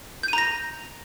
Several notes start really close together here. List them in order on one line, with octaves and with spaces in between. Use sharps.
G6 D#7 A#5 A#6